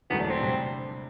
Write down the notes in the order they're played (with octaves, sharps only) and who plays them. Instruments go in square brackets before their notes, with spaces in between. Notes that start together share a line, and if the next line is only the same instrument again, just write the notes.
[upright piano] E1 E2 D3 F#3 A3 [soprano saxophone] B3
[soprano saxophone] D4
C4
[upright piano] C3 G3 D4